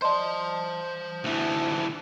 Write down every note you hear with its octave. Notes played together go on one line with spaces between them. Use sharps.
C5 D5 D#5 A5 C6
D2 E3